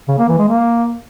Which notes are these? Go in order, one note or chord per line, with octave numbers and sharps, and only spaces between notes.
C#3
A#3
E3
G#3
A#3